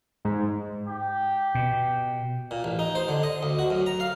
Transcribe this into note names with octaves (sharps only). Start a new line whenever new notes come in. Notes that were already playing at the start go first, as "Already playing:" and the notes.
G#2
G4
B2
A#2
A1
D#4
C5
D3
D#5
D2
F#4
F#2
A#5
F5